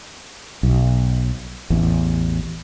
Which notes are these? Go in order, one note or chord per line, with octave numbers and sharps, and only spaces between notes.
B1
A1 E2